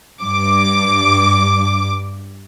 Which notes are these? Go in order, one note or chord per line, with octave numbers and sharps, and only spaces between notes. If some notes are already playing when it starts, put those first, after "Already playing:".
G2 D6